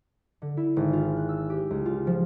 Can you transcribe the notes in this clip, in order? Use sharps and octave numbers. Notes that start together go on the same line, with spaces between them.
D3
E4
G#1
F4
F#6
E6
G4
C#2
F4
F3